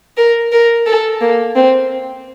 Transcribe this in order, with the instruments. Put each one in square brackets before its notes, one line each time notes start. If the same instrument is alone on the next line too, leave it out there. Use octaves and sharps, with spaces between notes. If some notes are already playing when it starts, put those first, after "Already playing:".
[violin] A#4
A#4
A4
A#3
C4